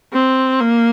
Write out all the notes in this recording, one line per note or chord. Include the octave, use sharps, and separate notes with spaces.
C4
A#3